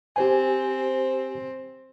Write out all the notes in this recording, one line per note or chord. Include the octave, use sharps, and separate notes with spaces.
C4 G4 C5 G#5